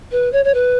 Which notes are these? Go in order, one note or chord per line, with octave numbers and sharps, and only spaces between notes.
B4
C#5
C#5
B4